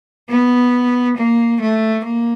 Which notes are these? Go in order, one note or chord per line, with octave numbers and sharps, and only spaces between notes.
B3
A#3
A3
A#3